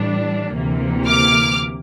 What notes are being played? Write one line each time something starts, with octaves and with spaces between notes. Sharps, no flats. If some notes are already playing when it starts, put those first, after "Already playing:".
Already playing: A2 E3 G3 D4
D2 C3 E3 A#3
D6 F6